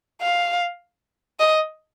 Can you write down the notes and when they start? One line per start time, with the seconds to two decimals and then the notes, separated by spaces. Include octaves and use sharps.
0.21 F5
1.39 D#5